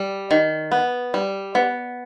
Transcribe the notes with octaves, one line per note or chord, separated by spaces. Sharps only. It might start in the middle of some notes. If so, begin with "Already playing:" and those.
Already playing: G3
D#3
B3
G3
B3